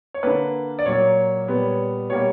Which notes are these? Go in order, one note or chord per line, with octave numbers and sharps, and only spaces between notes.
C#5
D3 A#3 B4
D5
A#2 F#3 A#3 C#5
A#2 G3 B3
B2 G3 A#3 C#5